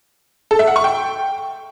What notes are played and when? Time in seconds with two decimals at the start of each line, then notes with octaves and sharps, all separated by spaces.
0.51 A4
0.59 E5
0.67 F#5
0.76 C#6
0.84 G5